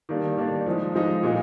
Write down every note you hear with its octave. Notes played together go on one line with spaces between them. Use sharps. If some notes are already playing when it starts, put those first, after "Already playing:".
D#3 G3 A#3 D4
D#3 G3 A#3 D4
F3 G#3 D#4
F3 G#3 D#4
A#2 G#3 D#4